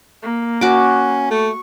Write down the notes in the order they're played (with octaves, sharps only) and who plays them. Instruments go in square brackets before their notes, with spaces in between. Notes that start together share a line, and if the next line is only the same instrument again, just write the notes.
[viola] A#3
[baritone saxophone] C#4 [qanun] F#4 D6
[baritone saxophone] A3 [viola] C#6